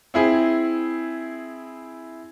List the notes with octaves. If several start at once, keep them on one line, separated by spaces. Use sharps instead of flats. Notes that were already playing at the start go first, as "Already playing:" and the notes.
C4 E4 G#4